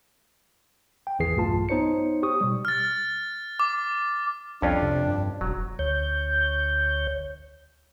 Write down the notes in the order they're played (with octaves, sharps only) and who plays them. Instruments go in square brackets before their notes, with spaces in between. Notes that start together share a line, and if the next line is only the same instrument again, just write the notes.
[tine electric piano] G5
G#1 E2 E3 G#4 C7
B1 G2 A3 F4 A5
B3 D#4 C5 C#5 C#7
G4 C#6 D#6
B2 G3
[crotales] F6 A6
D6
[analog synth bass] C2 [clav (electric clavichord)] F2 C#4 F4 [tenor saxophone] D4
[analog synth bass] C3
G2
[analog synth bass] E1 [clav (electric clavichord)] F#3
[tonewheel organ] D2 C#5 G6